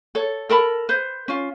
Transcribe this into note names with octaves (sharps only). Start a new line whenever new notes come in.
A4 C#5
A4 A#4 A5 B5
B4 C5
C#4 F4